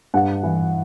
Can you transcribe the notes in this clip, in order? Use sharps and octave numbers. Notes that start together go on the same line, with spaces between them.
G2 F#5
E3